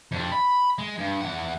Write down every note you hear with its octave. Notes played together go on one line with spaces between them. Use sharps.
F2 D4
B5
G#3
G2
E2 F#5